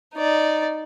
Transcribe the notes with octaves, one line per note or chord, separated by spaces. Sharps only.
D#4 D5